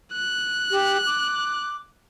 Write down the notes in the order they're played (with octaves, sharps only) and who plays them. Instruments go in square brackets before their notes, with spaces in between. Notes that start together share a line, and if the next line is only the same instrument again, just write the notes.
[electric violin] F#6
[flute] G4
D6